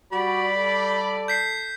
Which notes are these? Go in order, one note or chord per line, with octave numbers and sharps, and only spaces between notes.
G3 F#4 D5 B5
A4
G6 B6 C7